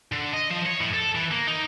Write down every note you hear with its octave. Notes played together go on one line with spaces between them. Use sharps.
D3
D#5
F3
C#5
A2
A4
E3
A#3
D#4